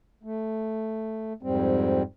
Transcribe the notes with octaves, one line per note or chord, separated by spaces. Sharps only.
A3
F2 G#2 G3 C4